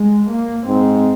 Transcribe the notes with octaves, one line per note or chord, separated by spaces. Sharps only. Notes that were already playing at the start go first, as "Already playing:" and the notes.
Already playing: G#3
A#3
G#2 C4